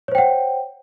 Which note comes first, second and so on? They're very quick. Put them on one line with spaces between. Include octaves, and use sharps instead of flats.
C#5 C5 G5 F#5